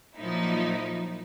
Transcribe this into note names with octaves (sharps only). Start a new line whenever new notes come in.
A#2 F3 F#3 A#3 D#4 E4